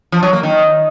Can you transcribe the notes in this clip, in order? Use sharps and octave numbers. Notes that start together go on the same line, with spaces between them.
F3
F#3
A#3
D#3